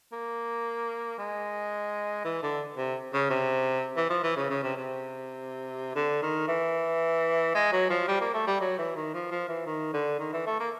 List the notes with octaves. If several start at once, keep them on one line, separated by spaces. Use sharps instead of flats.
A#3
G#3
E3
D3
C3
C#3
C3
E3
F3
E3
C#3
C#3
C3
C3
D3
D#3
E3
G#3
F#3
F3
G3
A#3
A3
G3
F#3
E3
D#3
F3
F3
E3
D#3
D3
D#3
E3
A3
A#3